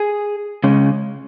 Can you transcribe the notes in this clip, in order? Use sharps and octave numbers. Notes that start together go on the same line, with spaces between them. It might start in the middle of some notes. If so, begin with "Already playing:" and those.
Already playing: G#4
C#3 G#3 C#4